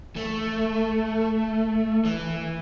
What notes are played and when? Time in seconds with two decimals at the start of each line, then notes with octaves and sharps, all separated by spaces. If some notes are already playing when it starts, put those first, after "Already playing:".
0.16 A3
2.05 E3